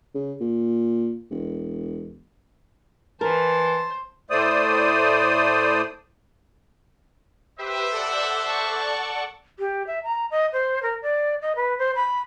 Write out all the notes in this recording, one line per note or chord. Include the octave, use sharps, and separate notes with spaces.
C#3
A#2
E1
E3 A#4 C5 A5
A2 A3 C5 D5 D#6
G4 B4 C5 E5
A4 D5 F#5
A5 C#6
G4
E5
A#5
D#5
C5
A#4
D5
D#5
B4
C5
B5